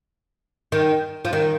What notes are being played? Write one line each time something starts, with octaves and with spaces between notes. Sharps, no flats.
D#3
F3
D#3